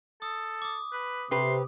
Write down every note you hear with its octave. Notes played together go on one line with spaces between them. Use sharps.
A4 D#6
D6 D#6
B4
C3 G4 B4 C6